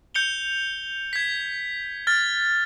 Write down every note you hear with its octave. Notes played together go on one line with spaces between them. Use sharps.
G6 C#7 F7 G7
G#6 B6
F6 A6